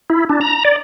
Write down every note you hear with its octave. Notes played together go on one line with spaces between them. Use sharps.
E4
D4
A#5
D5